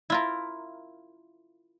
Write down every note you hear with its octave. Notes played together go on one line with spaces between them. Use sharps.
E4 F4 A#4